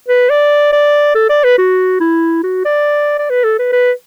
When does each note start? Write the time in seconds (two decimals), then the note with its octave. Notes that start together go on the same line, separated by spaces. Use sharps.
0.08 B4
0.30 D5
0.73 D5
1.15 A4
1.30 D5
1.44 B4
1.58 F#4
2.00 E4
2.43 F#4
2.65 D5
3.19 D5
3.30 B4
3.44 A4
3.59 B4
3.72 B4